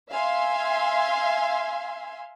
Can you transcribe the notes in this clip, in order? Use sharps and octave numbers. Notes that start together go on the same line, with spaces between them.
E5 F5 G#5 C6